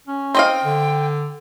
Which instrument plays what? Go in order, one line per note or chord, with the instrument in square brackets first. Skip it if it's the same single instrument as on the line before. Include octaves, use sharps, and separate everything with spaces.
[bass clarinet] C#4
[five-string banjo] C4 D#5 F5 [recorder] G5
[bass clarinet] D3